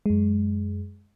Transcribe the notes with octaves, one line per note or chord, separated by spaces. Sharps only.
F#2 G#3